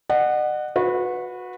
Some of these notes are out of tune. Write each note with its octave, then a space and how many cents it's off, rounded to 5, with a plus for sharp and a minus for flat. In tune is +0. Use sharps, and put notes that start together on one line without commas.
D#5 -45 F#5 +0
F#4 -25 B4 +0